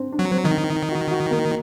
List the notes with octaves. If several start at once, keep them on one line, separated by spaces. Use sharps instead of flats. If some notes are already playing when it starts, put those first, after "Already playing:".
Already playing: C4 D4
D4
F#3
C4
D#3 D#4
D4
D#4
F#4
F#4
A#3